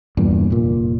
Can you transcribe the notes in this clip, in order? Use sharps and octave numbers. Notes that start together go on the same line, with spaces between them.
E2 G2 A#2
F1 A#2